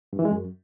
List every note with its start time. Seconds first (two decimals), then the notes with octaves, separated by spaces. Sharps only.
0.13 G2
0.19 E3
0.25 G#3
0.31 F#2